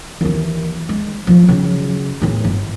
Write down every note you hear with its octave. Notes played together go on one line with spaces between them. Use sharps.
D#2 E3
G#3
F3 A3
F#2 C#3
E2 A2
G1